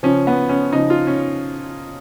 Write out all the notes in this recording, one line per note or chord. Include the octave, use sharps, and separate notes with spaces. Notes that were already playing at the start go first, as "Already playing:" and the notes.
C#3 F3 C#4
B3
C#4
C#3 F3 D#4
F4
C#4